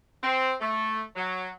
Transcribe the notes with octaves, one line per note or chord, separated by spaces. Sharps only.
C4
A3
F#3